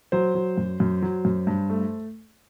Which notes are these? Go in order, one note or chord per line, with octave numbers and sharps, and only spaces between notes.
F#3 C5
F#3
F#2
F#2
F#3
F#2
G2
A3